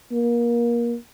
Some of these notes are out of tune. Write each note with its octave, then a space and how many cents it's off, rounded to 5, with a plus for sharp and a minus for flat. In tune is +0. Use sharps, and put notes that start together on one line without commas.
A#3 +25